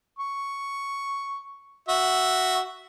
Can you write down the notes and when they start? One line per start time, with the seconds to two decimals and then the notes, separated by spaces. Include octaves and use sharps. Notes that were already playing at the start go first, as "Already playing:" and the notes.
0.19 C#6
1.88 F#4 E5